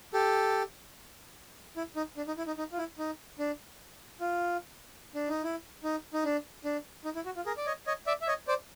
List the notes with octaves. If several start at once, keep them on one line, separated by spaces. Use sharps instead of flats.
G4 A4
E4
D#4
D4
D#4
E4
D#4
D#4
F4
E4
D#4
D4
F4
D4
D#4
E4
D#4
D#4
D4
D4
D#4
E4
F#4
F4
G#4 A#4
D5
C#5 D#5
C#5 D#5
D5 E5
E5
C#5 D#5
C5 D5